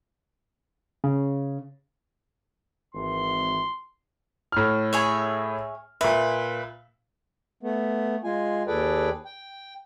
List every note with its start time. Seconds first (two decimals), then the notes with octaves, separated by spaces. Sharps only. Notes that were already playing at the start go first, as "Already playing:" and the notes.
1.04 C#3
2.95 G#1 E3 C6
4.52 A2 F6
4.93 G#4 C#5 E5
6.01 A#2 B4 E5
7.63 A3 B3
8.24 G#3 F4 G#5
8.67 D#2 G#4 A4 B4 D5 G5
9.26 G5